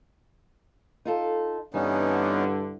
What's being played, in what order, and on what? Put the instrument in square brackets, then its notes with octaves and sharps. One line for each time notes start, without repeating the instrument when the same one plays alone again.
[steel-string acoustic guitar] D#4 F4 A4
[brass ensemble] G2 D3 [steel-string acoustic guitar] E3 [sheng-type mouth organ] B3 C#4 D#4